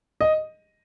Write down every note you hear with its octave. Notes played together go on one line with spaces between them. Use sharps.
D#5